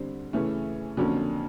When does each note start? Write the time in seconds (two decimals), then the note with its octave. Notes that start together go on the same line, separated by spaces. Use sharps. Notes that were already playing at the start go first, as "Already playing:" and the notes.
Already playing: D3 G3 C4
0.33 C#3 E3 A3 C#4
0.97 F2 D3 F#3 A#3 C#4